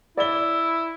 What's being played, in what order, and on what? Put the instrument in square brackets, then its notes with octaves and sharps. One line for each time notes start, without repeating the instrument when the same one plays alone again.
[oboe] E4 [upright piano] D5 G7